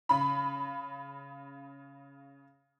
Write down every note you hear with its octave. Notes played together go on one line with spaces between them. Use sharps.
C#3 B5